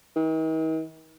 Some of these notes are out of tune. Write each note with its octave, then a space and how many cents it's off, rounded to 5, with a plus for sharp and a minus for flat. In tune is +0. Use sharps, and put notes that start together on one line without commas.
D#3 +45